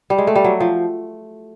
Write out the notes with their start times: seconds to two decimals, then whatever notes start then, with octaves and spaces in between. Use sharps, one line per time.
0.10 G3
0.18 G#3
0.27 A3
0.36 G3
0.44 F#3
0.60 F3